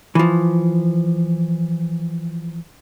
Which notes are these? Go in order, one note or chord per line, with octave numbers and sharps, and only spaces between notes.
E3 F3